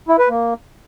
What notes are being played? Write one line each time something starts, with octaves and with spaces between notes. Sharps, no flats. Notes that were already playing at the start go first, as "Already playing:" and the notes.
E4
B4
A#3